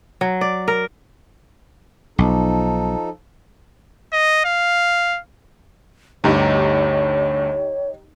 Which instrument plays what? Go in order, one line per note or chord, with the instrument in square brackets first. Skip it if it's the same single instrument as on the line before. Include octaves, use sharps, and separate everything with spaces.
[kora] F#3
D5
A#4
[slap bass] B1 [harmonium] F3 D#4 A4
[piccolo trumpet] D#5
F5
[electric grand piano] D2 G2 [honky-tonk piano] D#4 G4 A#5 [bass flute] C#5